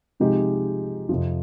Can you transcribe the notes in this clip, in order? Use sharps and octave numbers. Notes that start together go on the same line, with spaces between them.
C3 F3 G#3 D#4 G4
F2 C3 F3